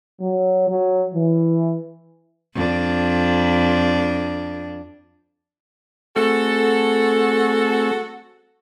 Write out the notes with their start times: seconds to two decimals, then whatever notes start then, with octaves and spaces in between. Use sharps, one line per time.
0.21 F#3
0.70 F#3
1.15 E3
2.54 F2 D4
6.16 A3 C4 F#4 G#4 A4